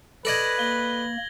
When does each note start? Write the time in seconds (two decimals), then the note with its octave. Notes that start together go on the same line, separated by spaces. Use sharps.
0.25 A4 B4 D5 D#5 G#6 A#6 F#7
0.59 A#3 G7